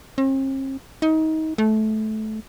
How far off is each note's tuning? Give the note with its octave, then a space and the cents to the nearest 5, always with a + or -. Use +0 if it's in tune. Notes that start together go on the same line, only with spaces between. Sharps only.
C4 +45
D#4 +25
A3 -20